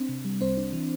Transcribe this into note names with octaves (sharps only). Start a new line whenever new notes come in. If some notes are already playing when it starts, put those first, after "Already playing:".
Already playing: C4 D4
C3
G3
C2 C4 C5
D4
E3